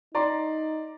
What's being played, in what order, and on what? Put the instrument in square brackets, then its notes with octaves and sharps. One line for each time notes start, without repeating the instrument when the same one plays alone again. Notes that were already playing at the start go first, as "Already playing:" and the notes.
[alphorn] D#4 [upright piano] D5 A#5 C6